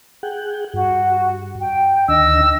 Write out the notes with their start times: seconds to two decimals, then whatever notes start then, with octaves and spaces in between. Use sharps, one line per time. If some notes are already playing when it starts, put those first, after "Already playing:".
0.23 G#4 F#5 G5
0.74 G2 F#4
1.60 G5
2.08 D2 D#3 D4 D#5 E6